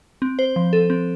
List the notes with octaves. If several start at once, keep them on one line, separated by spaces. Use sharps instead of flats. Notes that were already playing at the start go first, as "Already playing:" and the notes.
C4
C5
F3
A4
C4